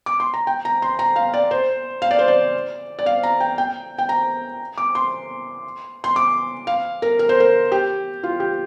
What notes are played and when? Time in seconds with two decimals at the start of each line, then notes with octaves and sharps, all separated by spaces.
0.06 D6
0.20 C6
0.34 A#5
0.47 G5
0.65 A#5
0.82 C6
0.99 A#5
1.16 F5
1.34 D5
1.51 C5
2.02 F5
2.11 D5
2.19 C5
2.28 D5
2.99 D5
3.06 F5
3.23 A#5
3.40 G5
3.58 G5
3.98 G5
4.09 A#5
4.78 D6
4.95 C6
6.04 C6
6.16 D6
6.67 F5
7.02 A#4
7.19 A#4
7.29 C5
7.40 A#4
7.72 G4
8.23 F4
8.40 G4